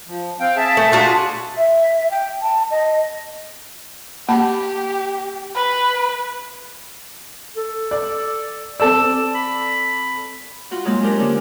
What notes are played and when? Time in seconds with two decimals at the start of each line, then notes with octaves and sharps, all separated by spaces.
0.08 F3
0.40 C4 F5 G5
0.56 G#4 E5 A5
0.77 A3
0.92 D4 F4 F#4
1.57 E5
2.11 G5
2.41 A5
2.71 D#5
4.29 A#3 G4 A5 B5
5.55 B4
7.57 A4
7.91 D5
8.80 C4 A4 D5 E6
9.34 B5
10.71 F4 F#4 F#5
10.85 F#3 G#3 A#3 C4 F4 F#4
11.02 C#4 D4 G4 A#4 C5
11.19 D3 A#3 C#4 D4